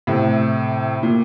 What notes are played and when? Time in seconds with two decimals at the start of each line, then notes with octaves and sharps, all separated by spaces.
0.07 A2 C3
1.03 A#2